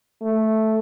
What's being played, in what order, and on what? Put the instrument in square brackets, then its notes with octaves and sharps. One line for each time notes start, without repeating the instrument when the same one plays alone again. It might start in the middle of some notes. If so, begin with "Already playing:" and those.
[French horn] A3